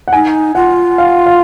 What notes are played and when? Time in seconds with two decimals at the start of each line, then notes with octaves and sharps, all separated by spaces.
0.08 F#5
0.13 D#4 G#5
0.55 F4 F#5
0.98 F5
1.27 F5